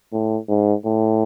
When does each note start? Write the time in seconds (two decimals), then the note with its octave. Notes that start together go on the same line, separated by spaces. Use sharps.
0.13 A2
0.49 G#2
0.85 A2